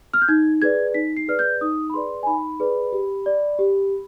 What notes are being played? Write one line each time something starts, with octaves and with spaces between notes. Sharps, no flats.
F6
G6
D#4 G#6
G#4 B4 D5 G#6
D#4 B6
C7
G#4 B4 D5 F6
G6
D#4 D#6
B5
G#4 B4 D5 C6
G#5
D#4 B5
G#4 B4 D5
G4
D5
G4